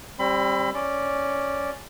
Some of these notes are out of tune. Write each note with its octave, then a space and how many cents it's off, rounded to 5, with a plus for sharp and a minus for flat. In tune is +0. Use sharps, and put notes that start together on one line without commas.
G3 +0 C4 +30 B5 +35
C#4 +0 D5 +0